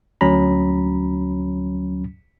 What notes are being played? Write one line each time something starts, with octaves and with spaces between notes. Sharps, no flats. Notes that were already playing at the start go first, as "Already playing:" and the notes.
D2 F#3 C#4 A#5 B5